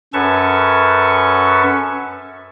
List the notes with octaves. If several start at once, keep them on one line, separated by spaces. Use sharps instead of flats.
F#2 C#4 A4 B4 A5 C#6